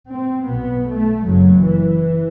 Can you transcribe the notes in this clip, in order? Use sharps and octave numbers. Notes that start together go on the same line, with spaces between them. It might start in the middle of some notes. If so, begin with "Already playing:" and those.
C4
B1 B2 B3
A3
F#1 F#2 F#3
E3